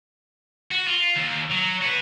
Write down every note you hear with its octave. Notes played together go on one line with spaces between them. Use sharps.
F#4
F4
D#2
F#3
F#4 B4